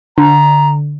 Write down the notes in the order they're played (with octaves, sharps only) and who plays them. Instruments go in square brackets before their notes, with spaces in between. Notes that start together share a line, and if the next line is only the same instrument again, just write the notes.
[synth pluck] D3 [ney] A#5